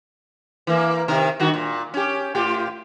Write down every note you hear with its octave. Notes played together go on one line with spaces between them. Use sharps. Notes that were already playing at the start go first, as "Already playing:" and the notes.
E3 A#3
C3 D#3 A#4
G2 D#3 F#4
A#2
C#4 G4
A2 F4 G4